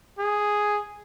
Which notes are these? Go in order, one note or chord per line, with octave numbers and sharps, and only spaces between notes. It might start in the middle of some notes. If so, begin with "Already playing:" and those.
G#4